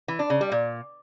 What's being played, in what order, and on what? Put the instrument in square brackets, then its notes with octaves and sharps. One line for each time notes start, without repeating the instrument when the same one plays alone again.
[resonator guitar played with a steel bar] E3
D4
C#3
G3
A#2